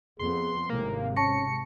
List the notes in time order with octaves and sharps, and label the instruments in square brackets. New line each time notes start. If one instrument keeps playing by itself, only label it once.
[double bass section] F2 B3 [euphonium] G#4 [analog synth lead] C6
[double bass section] G#1 C3 G#3 [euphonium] A2 [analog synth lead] A#3
[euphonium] C#4 [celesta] A5 C#6 A#6 [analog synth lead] C#7